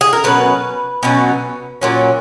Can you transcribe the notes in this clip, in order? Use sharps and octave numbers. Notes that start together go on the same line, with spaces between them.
G#4
A#4
B2 F#3 C#4 B4
B2 F#3 C#4
A#2 F#3 C#4